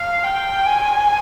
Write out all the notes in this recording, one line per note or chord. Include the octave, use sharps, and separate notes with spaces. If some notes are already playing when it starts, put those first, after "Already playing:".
Already playing: F5
G5
G#5